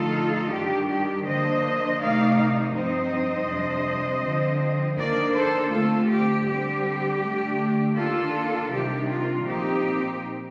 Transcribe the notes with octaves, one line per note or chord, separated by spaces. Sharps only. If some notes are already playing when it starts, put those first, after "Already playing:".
Already playing: D3 F3 A3 D#4 F4 A4
G2 D#3 G3 D4 G4
G4
D3 F3 A#3 D4 C5 D#5
C3 D#3 A3 D#4 D5 F5
G2 F3 C4 D#4 C5 D#5
F2 C3 G3 D4
D3 F3 C4
D#3 A#3 D4 A#4 D5
A4 C5
D3 A3 C4 F4 A4
G4
D3 G3 C4 G4
D3 A3 D4
D#3 A#3 D4 F4 A4
C3 D#3 G3 D4 G4
F4
A#2 F3 C4 D#4 G4